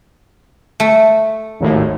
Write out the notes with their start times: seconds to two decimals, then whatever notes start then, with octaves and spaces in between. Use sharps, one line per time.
0.80 A3
1.60 G#1 D#2 A2